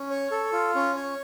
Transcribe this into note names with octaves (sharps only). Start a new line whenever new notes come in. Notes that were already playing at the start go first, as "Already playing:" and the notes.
Already playing: C#4
C#5
A4
F4
C#4
C#5